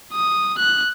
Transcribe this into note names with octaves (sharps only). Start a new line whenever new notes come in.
D#6
F#6